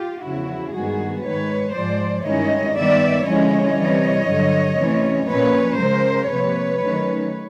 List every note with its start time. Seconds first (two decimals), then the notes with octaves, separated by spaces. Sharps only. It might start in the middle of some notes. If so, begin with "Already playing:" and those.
Already playing: F4 G4
0.22 E2 C#3 F3 E4 F#4
0.73 G2 D#3 G#3 B3 F#4 G#4
1.23 G#2 D#3 G#3 B4 C#5
1.74 G#2 F3 G#3 C5 D5
2.25 G2 D#3 G#3 C#4 E4 C#5 D#5
2.75 D#3 G3 B3 D#4 D5 E5
3.25 D3 F3 G#3 C#4 E4 C#5 D#5
3.76 C3 E3 G3
4.27 G2 D3 F#3
4.78 C3 E3 A3 C#4
5.27 A#2 F3 A#3 C#4 B4 C#5
5.78 C#3 F3 G#3 A#4 C5
6.29 C3 F3 A#3 B4 C#5
6.79 D#3 F#3 A3 C#4